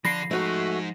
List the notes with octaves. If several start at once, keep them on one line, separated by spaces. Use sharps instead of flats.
D3 F3 D4 B5 A#6 C7
G#3 A3 D#4 F#4